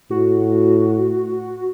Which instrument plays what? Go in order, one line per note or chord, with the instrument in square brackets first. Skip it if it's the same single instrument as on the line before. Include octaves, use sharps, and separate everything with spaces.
[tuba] A2 [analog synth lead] F#4